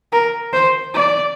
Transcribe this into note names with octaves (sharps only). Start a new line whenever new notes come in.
A#4
C5
D5